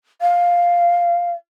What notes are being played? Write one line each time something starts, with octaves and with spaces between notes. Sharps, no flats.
F5